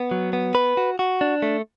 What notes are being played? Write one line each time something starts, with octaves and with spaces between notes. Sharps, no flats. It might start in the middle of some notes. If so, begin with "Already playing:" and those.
Already playing: B3
F#3
B3
B4
F#4
F#4
D4
A3